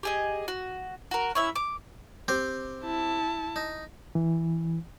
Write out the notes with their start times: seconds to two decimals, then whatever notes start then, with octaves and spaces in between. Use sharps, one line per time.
0.03 G4 G#4 D#5
0.48 F#4
1.11 F#4 A#4
1.35 C#4 E4 E5
1.56 D6
2.28 C4 G4 C5
2.84 E4 A5
3.56 D#4
4.15 E3